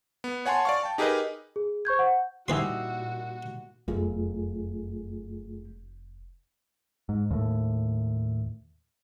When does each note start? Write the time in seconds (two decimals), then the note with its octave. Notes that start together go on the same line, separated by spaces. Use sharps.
0.24 B3
0.46 C#5 F#5 G#5 A5 C6
0.65 D5 F5 C#6
0.83 G5 A5
0.98 D#4 G4 G#4 A#4 B4 D#5
1.56 G#4
1.85 C5 C#6 G6 G#6
1.99 F#5
2.48 A#2 E3 G3 D#4 E4 F#4 B4 C6
3.88 F1 F#2 A3 B3 F4 G#4
7.09 G#2
7.31 D#2 A2